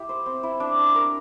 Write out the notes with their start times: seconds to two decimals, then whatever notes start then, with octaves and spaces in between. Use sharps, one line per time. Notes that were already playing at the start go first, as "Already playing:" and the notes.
Already playing: E4 G4
0.09 C5
0.26 C4
0.43 E4
0.60 D4
0.79 D4
0.95 A#4